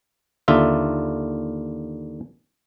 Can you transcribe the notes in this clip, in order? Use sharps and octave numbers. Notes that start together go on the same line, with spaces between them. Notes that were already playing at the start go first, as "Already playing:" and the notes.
D#2 D3 F4 E5